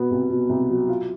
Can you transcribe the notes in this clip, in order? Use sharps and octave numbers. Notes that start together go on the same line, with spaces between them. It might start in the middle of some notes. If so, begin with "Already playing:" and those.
Already playing: B2 B3
C2
B2
C2
F#3
F4